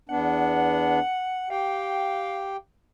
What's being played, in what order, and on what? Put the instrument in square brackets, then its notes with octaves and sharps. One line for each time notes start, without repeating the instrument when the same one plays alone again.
[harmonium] E2 B3 D4 [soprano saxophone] F#5
[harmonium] G4 G5 [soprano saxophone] F5